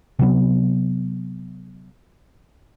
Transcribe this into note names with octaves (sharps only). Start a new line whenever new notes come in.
C3 F#3 B3